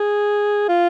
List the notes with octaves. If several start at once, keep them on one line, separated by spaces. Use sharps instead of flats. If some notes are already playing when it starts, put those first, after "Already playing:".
Already playing: G#4
F4